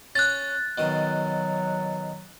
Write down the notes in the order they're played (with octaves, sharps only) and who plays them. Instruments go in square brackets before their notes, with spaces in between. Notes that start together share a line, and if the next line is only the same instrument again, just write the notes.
[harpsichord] C#4 [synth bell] F#6 A6
[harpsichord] B2 D#3 D#6 [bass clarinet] F#3